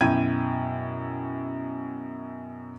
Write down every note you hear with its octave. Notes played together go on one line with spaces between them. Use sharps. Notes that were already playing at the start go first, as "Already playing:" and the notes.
F#2 B2 E4 G5 G#6 D#7